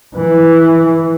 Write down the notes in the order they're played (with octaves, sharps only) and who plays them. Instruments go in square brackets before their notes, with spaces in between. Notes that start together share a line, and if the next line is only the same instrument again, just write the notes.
[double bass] E3